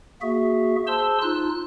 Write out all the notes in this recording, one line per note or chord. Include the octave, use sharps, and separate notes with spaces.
A#3 F#4 G#4 E5
G#4 C5 A5 C6 E6
D#4 F4 F#6